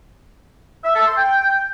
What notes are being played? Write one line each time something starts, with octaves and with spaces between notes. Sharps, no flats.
E5
A4
C6
G5